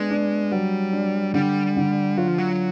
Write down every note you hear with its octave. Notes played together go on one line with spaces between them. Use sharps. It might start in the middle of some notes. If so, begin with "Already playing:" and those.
Already playing: G#3 B3 D4
D4
F#3 G3
D4
D3 G3
D3
F#3 F4
F3
F#3